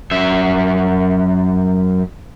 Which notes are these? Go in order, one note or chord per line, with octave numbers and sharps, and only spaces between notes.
F#2 E5